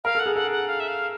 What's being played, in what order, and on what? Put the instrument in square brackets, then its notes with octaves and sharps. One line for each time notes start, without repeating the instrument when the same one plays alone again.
[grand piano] A#4 [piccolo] F5
[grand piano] A4 [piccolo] F#5
[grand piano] G#4
[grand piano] A4 [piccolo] F#5
[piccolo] F#5
F5
E5
F5